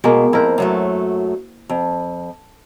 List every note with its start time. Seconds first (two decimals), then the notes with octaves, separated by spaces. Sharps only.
0.04 B2 G#3 A#3
0.33 F2 E4 A#4 C5
0.58 F#2 F#3 A3
1.69 F2